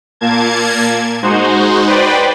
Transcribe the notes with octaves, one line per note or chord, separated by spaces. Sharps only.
A#2 A#3 A5 G#6
G#3 D#4 F#4 C5
B4 C5 D5 G5